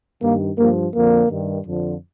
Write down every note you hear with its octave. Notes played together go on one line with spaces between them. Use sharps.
G2 D#3 A#3
G2 F3 A#3
F2 D3 F3 A#3
G2 D#3
F2 D3 F3